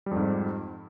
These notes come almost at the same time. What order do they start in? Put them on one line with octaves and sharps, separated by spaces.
G3 F2 G#2